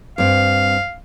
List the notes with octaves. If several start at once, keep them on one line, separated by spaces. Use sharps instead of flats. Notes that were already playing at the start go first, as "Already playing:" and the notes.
G2 C4 F5